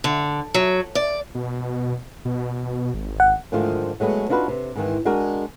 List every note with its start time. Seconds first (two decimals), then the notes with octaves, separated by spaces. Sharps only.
0.04 D3
0.54 F#3
0.95 D5
1.35 B2
2.25 B2
2.94 G#1
3.20 F#5
3.52 G#2 D3 D#3 F3 A3 F4
4.00 F#3 G#3 A3 B3
4.29 D4 D#4 F4 F#4 B4
4.48 C3
4.76 G#2 D#3 E3
5.05 G#3 D4 F#4 G#4 A#4